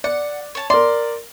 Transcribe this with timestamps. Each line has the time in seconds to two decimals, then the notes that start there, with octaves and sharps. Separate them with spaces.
0.04 D5 F#5
0.55 C#5 A5
0.70 A#4 D5 C6